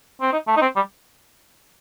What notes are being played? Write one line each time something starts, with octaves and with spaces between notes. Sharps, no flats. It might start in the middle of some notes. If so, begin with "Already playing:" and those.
C4
D#4
A3
D#4
C4
G3